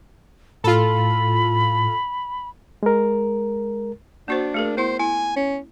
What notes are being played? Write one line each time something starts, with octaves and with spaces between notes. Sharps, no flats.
A2 F4 A4 B5
G#3 A#4
A#3 D4 F#4 C5
A3 G#4 A#4
B3 E4 C5
E4 G#5
C#4